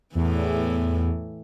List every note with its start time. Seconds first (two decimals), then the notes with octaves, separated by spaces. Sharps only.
0.15 E2 A2 E3